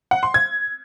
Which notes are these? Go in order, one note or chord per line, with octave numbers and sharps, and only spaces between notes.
F#5
C6
G#6